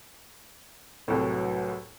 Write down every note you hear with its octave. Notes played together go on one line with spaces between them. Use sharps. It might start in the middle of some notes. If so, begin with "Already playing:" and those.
C2 A2 F#3 B4